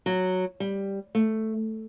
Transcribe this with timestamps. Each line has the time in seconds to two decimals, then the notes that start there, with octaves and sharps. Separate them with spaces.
0.06 F#3
0.60 G3
1.15 A3